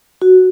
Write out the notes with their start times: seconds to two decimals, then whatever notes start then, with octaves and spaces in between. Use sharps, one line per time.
0.22 F#4